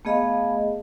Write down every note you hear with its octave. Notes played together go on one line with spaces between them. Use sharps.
A3 B3 G#4 D#5 F5 B5